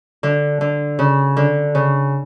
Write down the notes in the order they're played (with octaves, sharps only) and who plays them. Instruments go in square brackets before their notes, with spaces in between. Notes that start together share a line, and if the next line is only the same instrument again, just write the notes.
[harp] D3
D3
C#3
D3
C#3